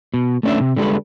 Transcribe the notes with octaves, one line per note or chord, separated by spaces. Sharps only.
B2
A3 B3 C#4 D4 D5 E5
C3
D3 G3 G#3 G#4 A4 B4